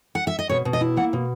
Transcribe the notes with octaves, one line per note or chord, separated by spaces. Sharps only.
F#5
E5
D#5
B2 C#5
B2
D#5
E4
A#3 F#5
B2